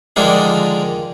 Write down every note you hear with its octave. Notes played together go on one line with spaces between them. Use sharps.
D3 D#3 F3 G#3 A#3 D4